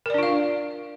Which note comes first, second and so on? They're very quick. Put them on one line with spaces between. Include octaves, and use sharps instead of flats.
A#4 D5 D4 F4 F5